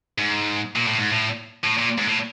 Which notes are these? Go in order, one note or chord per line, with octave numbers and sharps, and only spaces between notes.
G#2
A#2
A2
G#2
A2
A2
A#2
G#2
A2